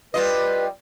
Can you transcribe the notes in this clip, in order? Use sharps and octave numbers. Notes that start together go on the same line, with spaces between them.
G3 F4 B4 D#5